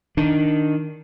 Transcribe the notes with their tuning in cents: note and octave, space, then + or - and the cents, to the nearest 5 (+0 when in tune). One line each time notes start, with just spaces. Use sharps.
D#3 +0 D4 +0